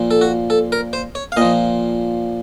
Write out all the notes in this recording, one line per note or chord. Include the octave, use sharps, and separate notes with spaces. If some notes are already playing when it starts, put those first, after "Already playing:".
Already playing: A#2 F3
A4
F#4
A4
A#4
C5
C#5
F5
A#2 F3 D#5